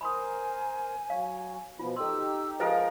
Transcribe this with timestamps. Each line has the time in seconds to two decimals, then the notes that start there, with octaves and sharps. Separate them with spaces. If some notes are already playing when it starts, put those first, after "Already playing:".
0.01 A#4 C5 G#5 B5 C6 D#6
1.10 F#3 C#5 F5
1.79 B2 F3 B3 F4 B5
1.96 D#4 G4 A4 C6 E6
2.60 F3 G#3 A#4 B4 F5